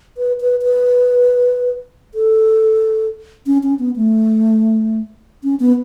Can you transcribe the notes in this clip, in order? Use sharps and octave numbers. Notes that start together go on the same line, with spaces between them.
B4
B4
B4
A4
C#4
C#4
B3
A3
C#4
B3